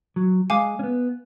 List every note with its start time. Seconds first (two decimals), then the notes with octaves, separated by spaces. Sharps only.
0.16 F#3
0.50 G#3 F5 G#5 D6
0.79 C#4
0.83 B3